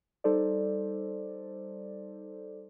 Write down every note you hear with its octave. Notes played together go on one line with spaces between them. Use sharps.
G3 D#4 A4 C5 D5